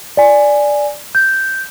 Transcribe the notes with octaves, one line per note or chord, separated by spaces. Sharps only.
D5 G#5
G6